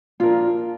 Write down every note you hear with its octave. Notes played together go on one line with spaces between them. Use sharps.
A#2 F3 D4 F4 A#4 D5